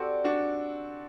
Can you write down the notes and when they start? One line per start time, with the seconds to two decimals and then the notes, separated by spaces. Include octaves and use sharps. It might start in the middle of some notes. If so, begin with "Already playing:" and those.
Already playing: C4 F#4 G4 A4 D5
0.24 D4 F#4